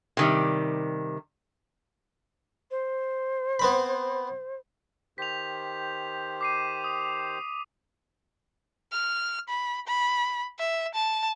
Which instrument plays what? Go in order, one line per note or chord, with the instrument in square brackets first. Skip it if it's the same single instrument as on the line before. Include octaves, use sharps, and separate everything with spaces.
[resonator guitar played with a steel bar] C3 D#3 G3
[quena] C5
[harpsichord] B3 C4 B5
[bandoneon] D#3 G4 C5 [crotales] B6 F7
[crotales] D6 C7 D#7
D#6 F7
[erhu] F6
B5
B5
E5
A5